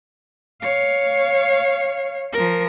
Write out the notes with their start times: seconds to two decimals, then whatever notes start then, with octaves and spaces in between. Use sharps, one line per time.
0.62 C#5 F5
2.33 F3 A#4